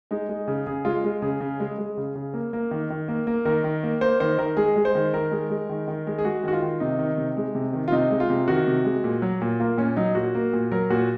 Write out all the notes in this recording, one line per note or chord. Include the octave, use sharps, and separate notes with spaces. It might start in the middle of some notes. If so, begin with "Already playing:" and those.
G#3 D#4
G#3
C#3
C#3 G#4
G#3 F4
G#3
C#3 G#4
C#3
G#3
G#3
C#3
C#3
A#3
A#3
D#3
D#3
A#3
A#3
D#3 A#4
D#3
A#3
A#3 C5
D#3 C5
D#3 A#4
G#3 G#4
G#3
C5
D#3
D#3 A#4
G#3
G#3
D#3
D#3
G#3
G#4
G#3 F#4
D#3 F#4
F4
D#3
C3 D#4
D#3
C3
G#3
C3
D#3
F4
C3 D#4
G#3
F4
C3
D#3 F#4
C3
G#3
A#2
F#3
A#2
A#3 F4
A#2 C#4
F#3 D#4
A#2 F#4
A#3
A#2
F#3 A#4
A#2 F#4